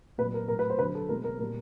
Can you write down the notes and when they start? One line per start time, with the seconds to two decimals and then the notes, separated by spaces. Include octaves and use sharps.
0.18 A#2 B4
0.23 F#3
0.34 A#4
0.48 A2 F#3 A#4
0.59 B4
0.70 C5
0.79 D3 F#3 B4
0.95 A4
1.09 B2 G#3 A#4
1.24 A#4
1.39 A#2 G3 A#4